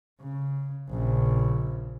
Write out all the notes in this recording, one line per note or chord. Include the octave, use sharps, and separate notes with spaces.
C#3
A#1 C#3